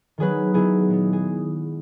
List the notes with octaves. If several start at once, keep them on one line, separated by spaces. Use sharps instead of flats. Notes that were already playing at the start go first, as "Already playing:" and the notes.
D#3 F#3 B3 G#4 B4
D#3 F#3 B3 E4 G#4
A#2 G#3 B3
G#4